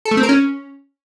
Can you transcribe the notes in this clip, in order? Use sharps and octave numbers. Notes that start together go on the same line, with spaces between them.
A4
A3
C4
A#4
C#4